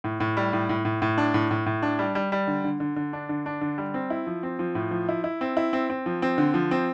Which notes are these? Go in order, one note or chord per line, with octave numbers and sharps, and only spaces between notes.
A2
A2
G3
A2
A2
A2
A2
D4
A2
A2
A2
D4
G3
G3
G3
D3
D3
D3
D3
D4
D3
D4
D3
G3
C4
E4
F3
C4
F3
A2
F3
E4
E4
C4
E4
C4
C4
F3
C4
D3
F3
C4